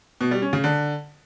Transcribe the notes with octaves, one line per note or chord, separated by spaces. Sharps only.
B2
G3
C#4
C#3
D3